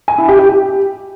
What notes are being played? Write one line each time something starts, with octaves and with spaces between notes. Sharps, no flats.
G#5
E4
G4
G4
G4